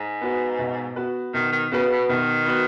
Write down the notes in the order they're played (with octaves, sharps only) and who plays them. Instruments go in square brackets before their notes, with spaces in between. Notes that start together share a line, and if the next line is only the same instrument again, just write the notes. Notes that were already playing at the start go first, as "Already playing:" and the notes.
Already playing: [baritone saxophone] G#2
[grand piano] B3 F#4 B4
B2
B3 F#4 B4
[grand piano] B2 [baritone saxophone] D#3
[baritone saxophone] D#3
[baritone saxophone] C#3 [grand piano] B3 F#4 B4
[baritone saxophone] B2
[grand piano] B2 [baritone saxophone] D#3
[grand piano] B3 F#4 B4